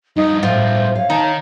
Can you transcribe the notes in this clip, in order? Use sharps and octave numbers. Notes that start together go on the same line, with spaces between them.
G2 F3 D#4
A2 F4 C5
C#5 F5
D#3 D#4 A5
C#5